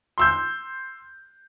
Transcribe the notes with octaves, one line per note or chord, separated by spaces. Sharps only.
C6 E6 G6